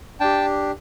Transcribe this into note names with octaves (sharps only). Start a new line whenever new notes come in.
D4 G4 G5 A5